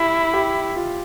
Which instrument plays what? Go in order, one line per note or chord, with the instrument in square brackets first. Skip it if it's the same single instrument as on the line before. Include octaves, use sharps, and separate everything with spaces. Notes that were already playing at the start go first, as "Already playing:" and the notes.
Already playing: [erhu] E4 [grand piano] G4
[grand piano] G4
F4